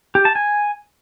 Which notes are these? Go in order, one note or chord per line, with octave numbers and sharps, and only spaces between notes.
G4
A5
G#5